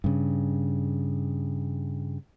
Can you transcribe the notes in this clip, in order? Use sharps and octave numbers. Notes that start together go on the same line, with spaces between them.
G2 C#3